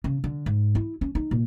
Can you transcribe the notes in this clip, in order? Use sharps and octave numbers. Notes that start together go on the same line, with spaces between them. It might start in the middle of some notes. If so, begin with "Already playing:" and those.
C#3
D3
G#2
E4
C#4
D#4
A#2